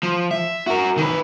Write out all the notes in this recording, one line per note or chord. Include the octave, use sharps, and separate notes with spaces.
F3
E5
F#4 A#4
D#3 B4